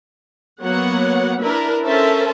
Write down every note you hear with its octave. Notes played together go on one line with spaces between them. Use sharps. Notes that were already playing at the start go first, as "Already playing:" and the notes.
F#3 A#3 B3 C#5 F#5
D4 E4 A#4 B4 E5
C#4 A4 A#4 C5 E5 A5